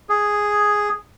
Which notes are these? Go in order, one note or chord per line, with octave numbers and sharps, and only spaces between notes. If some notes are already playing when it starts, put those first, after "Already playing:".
G#4